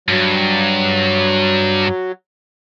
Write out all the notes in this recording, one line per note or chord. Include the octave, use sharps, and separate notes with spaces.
G2 F#3